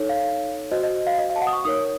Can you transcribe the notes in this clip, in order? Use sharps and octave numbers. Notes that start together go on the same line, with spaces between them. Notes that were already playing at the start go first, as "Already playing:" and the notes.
Already playing: D#4 A4 C#5
F5
F#4 C5 D#5
D#5
F5
D#5
F5
A5
F#5
D#6
C#6
D#4 A#4 C#5 D#6